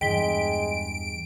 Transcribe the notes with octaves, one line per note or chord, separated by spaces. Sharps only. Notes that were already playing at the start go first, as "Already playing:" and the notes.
E2 G2 E3 G#3 G5 B6 D7 G7